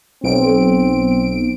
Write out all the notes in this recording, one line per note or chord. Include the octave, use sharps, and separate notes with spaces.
B1 C4 D7